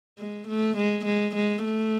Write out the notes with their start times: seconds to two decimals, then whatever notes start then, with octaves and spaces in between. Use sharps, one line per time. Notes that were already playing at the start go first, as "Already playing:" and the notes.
0.19 G#3
0.47 A3
0.77 G#3
1.05 G#3
1.35 G#3
1.64 A3